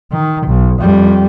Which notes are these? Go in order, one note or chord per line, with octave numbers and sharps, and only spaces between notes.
D#3
B1
F2 G3